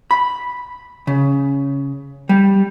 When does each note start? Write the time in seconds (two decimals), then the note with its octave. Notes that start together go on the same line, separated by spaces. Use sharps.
0.11 B5
1.07 C#3
2.29 G3